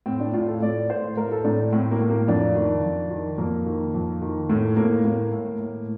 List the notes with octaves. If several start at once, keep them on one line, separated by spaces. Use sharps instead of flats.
A2 C4
D4
A2 F4
A4
A2 D5
A2 C5
A2 A#4
A4
A2 D4
A2 C4
A#3
A2
A#3
F2 D4
D#3
F2
D#3
F2 A#3
D#3
F2
D#3
A2 A3
A2 A#3
A2 A#3
A2
A2